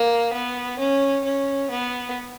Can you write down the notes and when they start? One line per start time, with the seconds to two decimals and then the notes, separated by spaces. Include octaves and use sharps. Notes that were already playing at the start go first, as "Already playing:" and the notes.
Already playing: A#3
0.33 B3
0.79 C#4
1.24 C#4
1.70 B3